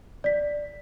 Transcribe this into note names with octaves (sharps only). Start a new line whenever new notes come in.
D5 B6